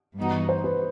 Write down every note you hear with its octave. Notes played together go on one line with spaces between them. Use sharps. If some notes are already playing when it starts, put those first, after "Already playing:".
G2 E3 B3 D#4 F#4
C5
B4